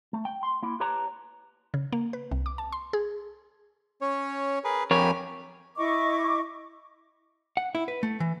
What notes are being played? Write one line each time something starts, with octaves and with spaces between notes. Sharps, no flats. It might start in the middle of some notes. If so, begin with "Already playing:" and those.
A3
G5
C6
A#3 E4
G4 B4 C#5 A5 A#5
C#3
A#3
B4
C2
D6
A5
C6
G#4
C#4 C#5
G#4 A#4 B4
F2 G4 A#4 C#5 G#5 B5
E4 D#5 C#6 D6
F#5
E4
B4
A3
E3